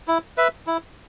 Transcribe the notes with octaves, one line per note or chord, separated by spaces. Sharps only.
E4
B4 E5
E4